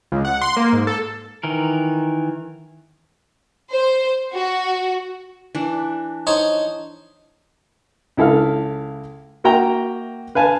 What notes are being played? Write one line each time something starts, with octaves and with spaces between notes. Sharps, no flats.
C#2
F#5
C6
A#3
G#2
A4
D#3 E3 A#4
C5
F#4
E3 D4
D#4 C5 C#5
C#2 E4 A4 F5 F6
A#3 F#4 E5 G5 A#5
B4 F5 G#5 A5